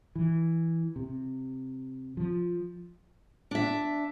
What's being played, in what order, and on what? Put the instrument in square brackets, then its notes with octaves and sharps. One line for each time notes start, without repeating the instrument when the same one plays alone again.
[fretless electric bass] E3
C3
F3
[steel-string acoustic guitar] D4 E5